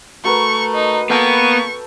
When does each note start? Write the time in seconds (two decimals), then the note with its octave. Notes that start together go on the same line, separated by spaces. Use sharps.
0.25 A3 F#4 A#4 B4 C#6
0.75 D#4
1.10 A#3 B3 A4 G5 A5 C#6